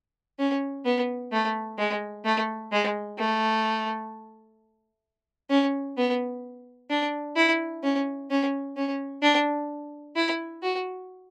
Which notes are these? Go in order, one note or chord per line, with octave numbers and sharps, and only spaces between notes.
C#4
B3
A3
G#3
A3
G#3
A3
C#4
B3
D4
E4
C#4
C#4
C#4
D4
E4
F#4